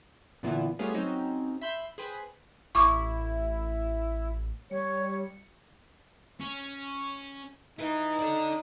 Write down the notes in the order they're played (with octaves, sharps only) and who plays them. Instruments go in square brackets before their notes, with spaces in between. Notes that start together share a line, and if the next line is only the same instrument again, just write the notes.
[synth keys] A#2 D3 E3 B3 E4 F4
G3 A3 B3 C#4 F4 G#4
F#3 C4 C#4 D#4 F#4
E5 B5 C6 G6
G#4 B4 C5 G5 B5
[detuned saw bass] A1 [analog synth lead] E4 [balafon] C#6 D6
[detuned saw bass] G3 [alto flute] C#5 [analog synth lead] C#7
[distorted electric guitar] C#4
[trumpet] D#4 [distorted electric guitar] E4 B4
[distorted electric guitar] A4 D5